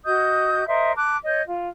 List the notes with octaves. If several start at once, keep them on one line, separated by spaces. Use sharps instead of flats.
F#4 D#5 D#6 G6
A#4 C5 D#5 E5
A5 D6 F#6
C#5 D#5 G6
F4